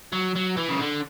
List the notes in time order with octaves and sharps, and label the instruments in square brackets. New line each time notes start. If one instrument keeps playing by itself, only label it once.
[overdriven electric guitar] F#3
F#3
E3
C#3
D3